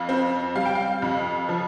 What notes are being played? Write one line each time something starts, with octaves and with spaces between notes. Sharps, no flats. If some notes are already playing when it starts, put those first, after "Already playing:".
Already playing: F2 F5
C4
G3 F5
G5
F5
F2
F3